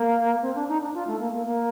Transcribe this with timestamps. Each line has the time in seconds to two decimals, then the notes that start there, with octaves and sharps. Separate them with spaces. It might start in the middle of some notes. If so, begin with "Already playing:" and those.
Already playing: A#3
0.42 C4
0.55 D4
0.68 D#4
0.81 D4
0.94 F4
1.07 A3
1.19 A#3
1.32 A#3
1.46 A#3